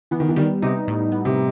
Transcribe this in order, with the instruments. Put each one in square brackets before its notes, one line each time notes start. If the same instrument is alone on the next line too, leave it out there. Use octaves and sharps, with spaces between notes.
[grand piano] E3 [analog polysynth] B3
[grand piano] D#3
E3
[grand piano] D#3 [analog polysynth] G3
[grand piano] C3 [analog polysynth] D#4
[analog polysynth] A2
B3
[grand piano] C3